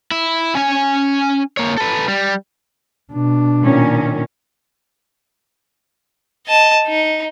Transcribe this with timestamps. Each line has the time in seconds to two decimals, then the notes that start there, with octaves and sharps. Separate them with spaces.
0.11 E4
0.55 C#4 G#5
1.57 A#3 C#5
1.78 A4 B4
2.08 G3
3.13 B2 D4
3.62 A#2 D#3 C#4
6.47 D#5 A5
6.87 D#4